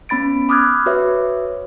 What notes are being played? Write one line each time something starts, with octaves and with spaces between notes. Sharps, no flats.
B3 C#4 B5 A6 D7
B5 D6 D#6 F6 F#6 G#6
F#4 B4 C#5 E5